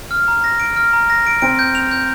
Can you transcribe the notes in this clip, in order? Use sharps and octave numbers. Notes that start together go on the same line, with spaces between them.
F6
A#5
A#6
D7
F6
A#5
A#6
D7
C4 D7
G6
F7
G6